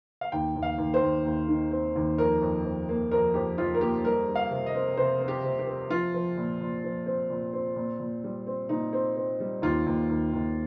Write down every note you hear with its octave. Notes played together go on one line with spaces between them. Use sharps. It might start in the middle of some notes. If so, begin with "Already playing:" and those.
F5
D#2 G5
D#2
F5
D#2
C5
D#2
D#2
D#3
C4
D#2
F2 A#4
F2
F2
A#3
F2 A#4
F2 G4
F2 F4
A#4
A#3 G4
G3 A#4
G3
F5
C3
D#5
C4
C3 C5
C4
G4
C3
G4
C4
F3 F4
F3
A#2
A#2
F3
C4
A#2
C4
A#2
A#2
G3
C4
A#2 D#4
C4
C4
G3
D#2 F4
D#2
D#2
D#2